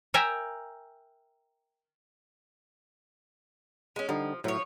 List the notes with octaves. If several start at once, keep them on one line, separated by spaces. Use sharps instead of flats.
A#4 E5 G5 G#5 A#5
G#3 C#4
D3 F3 G3 D#4
A2 F3 F#3 C#5 E5